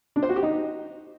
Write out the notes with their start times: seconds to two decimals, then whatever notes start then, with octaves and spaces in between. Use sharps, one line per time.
0.16 D4
0.23 C5
0.29 F#4
0.36 G4
0.43 D#4